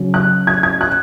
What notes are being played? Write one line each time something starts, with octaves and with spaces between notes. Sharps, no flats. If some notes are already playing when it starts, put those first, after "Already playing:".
Already playing: C#3 F#3 C#4
F#6
G#6
G#6
F#6